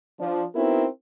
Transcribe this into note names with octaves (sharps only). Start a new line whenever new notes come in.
F3 D4
B3 C4 D#4 E4 F#4 A#4